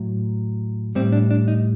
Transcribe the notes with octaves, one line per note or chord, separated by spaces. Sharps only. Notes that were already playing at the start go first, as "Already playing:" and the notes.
Already playing: A2 F#3
A2 G3 C4
D4
D4
D#4